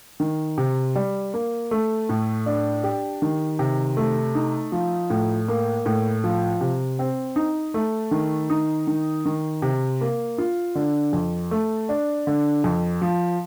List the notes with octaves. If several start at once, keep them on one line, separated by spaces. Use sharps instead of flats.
D#3
C3
G3
A#3
A3
A2
D4
G4
D#3
C3
A3
D#4
F3
A2
A#3
A2
F3
C3
C4
D#4
A3
D#3
D#4
D#3
D#3
C3
A#3
F4
D3
F2
A3
D4
D3
F2
F3